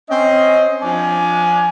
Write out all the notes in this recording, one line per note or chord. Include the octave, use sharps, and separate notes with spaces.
C4 C#4 D#5
F3 D4 D5 G#5